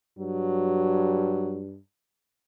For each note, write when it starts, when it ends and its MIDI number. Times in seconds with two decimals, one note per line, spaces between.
0.19 1.79 43
0.19 1.63 54